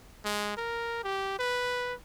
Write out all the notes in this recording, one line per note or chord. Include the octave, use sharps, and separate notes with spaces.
G#3
A#4
G4
B4